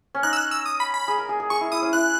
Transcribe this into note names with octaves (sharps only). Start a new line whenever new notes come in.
C#4
D#4 F#6
E6
F#6
E6
D#6
B5
B5
G#4
A#4
G#4
G#4
G#4 C#6
E4
E4 D#6
C#4
E4 F#6